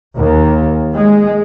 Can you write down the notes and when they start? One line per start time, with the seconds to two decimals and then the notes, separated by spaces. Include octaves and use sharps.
0.16 D#2
0.94 G#3